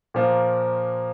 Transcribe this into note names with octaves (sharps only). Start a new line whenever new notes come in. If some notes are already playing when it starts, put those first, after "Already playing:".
A#2 F3 A#3